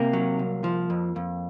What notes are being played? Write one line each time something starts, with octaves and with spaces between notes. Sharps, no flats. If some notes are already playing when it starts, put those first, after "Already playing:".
Already playing: C3 A#3
F#3
C2
F3
F2
F2